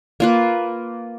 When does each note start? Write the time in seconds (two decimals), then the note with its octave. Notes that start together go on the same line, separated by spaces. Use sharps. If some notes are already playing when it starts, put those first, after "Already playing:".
0.20 A#3 F4 B4